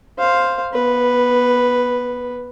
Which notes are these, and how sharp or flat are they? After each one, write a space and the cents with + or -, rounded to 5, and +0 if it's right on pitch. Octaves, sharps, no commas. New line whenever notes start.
C5 +0 F5 +0
B3 -25 B4 +0